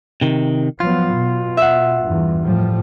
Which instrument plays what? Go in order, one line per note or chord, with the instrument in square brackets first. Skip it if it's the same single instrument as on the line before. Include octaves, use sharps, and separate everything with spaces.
[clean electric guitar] C3 D#3
[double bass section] F3 F#3 B3 [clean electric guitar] F4
[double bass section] B2
[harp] E5 F#5
[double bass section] E2 G2
A2 F3 G3